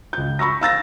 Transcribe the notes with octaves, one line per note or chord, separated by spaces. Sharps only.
C#2 G6
B5 C#6 E6 A#6
F5 E6 A6 A#6